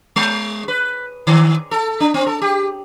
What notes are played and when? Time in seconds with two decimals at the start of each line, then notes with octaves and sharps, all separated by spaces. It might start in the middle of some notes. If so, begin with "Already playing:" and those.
0.16 G#3
0.68 B4
1.27 D#3
1.71 A4
2.00 D4
2.14 C4
2.27 A4
2.42 G4